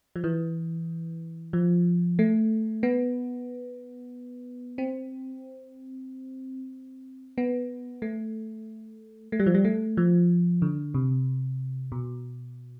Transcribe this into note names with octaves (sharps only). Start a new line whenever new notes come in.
F3
E3
F3
A3
B3
C4
B3
A3
A3
G3
F3
G3
A3
F3
D3
C3
B2